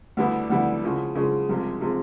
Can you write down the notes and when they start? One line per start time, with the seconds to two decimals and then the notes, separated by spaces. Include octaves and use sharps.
0.17 D2 D3 G3 B3 E4
0.50 D2 D3 G3 B3 E4
0.83 C#3 F3 G#3
1.15 C#3 F3 G#3
1.49 C2 C3 F3 G#3
1.81 C3 F3 G#3